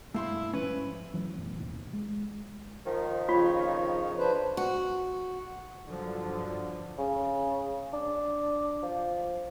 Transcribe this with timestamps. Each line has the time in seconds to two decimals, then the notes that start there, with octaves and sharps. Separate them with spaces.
0.14 G2 B2 G3 A3 E4 F5 C6
0.54 G#2 F3 G3 C#4 B4
1.14 E3 F#3 G3 A3
1.37 A1 F#2 B2
1.59 A1 D#2 A2 C3
1.93 G#3
2.86 D#3 F3
3.29 F2 C#3 F4 C#5
4.18 D4 B4 C5
4.57 F#4
5.86 G2 D3 F3 F#3
6.99 C#3
7.93 D4
8.83 F3